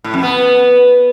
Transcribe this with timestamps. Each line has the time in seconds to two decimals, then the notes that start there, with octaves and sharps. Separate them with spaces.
0.04 A2
0.14 F2
0.23 B3